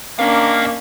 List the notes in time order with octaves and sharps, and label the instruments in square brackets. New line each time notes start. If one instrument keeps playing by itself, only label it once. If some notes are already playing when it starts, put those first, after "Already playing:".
[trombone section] A#3 [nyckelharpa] C#4 D4 [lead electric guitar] D#5 F5